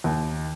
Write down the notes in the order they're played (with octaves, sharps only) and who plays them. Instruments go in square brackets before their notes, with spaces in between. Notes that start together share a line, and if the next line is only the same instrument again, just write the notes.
[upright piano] D#2